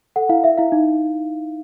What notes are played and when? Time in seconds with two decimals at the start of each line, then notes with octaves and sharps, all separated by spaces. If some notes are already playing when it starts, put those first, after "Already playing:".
0.16 A4 F#5
0.29 E4 F5
0.44 E4 E5
0.57 E4 F5
0.72 D#4